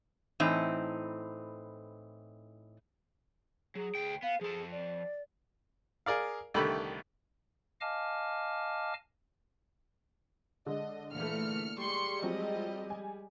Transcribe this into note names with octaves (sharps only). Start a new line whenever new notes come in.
A2 E3 C4 D#4
F#3 G#4
D2 G5
B3 F5
F3 G#4 A4
D5
G#4 A#4 D5 F5
C2 D3 D#3 A3 G4 B5
D#5 F5 G#5 A5 D6 F6
D3 G#3 D#5
A#2 E3 A3 F6 C#7
G3 G#3 C6 C#6 C#7
F3 F#3 C4 D#5
G#5